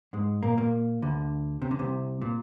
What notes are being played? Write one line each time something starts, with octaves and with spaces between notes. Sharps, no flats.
G#2 G#3
A#2 A#3
A#2 A#3
D2 D3
C3
D3
C2 C3
A#2